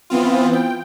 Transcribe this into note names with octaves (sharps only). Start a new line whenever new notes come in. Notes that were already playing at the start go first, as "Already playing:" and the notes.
E3 B3 C4 F4
G5